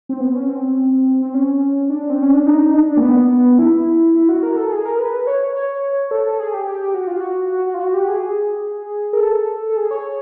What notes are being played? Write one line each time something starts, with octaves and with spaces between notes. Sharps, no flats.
C4
B3
C#4
C4
C4
C#4
D4
C4
C#4
D4
D#4
D4
D4
A#3
B3
E4
E4
F#4
A#4
A4
G#4
A#4
B4
C#5
C#5
A4
A4
G#4
G4
G4
G4
F#4
F4
F#4
F#4
F#4
F4
F#4
G4
G#4
A#4
A4
A4
G#4
C#5